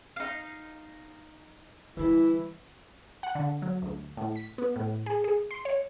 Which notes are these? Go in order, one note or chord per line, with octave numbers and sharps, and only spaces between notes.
D#4 F5
D3 E3 G3 E4
F#5
D3
F#3
D2
A2
B6
B3
A2
G#4
G#4
C6
C#5